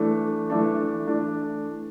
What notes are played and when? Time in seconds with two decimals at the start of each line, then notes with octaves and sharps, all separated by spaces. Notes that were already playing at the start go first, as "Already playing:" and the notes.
Already playing: E3 A3 D4
0.50 E3 A3 D4
1.07 E3 A3 D4